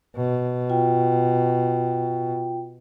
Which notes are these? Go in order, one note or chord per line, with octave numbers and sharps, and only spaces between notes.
B2
F4 G5